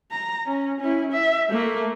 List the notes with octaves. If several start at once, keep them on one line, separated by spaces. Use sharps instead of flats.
A#5
C#4
C#4 E4
E5
A3 A#3